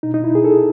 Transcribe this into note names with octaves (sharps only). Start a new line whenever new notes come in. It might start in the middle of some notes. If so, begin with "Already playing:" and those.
B2 D#4
D#4
B2
E4
B2 G#4
A4